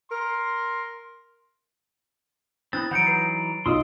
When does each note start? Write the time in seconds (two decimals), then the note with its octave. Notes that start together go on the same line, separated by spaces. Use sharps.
0.11 A#4 C6
2.73 B3 C4 D4 E4 F#6 A6
2.91 E3 F#3 D#4 F#5 G6 A6 C#7 D7
3.06 B4 C7
3.66 B1 F4 D#5 C6 D#6 E6